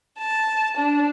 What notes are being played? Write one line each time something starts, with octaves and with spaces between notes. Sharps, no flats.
A5
D4